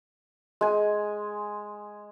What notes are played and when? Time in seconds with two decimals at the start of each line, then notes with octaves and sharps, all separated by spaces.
0.61 G#3 G#5